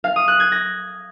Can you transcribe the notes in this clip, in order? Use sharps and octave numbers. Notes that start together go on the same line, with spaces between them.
F5
D#6
F#6
G#6
A#6